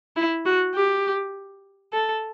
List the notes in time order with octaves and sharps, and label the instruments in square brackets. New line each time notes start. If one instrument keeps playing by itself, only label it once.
[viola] E4
F#4
G4
A4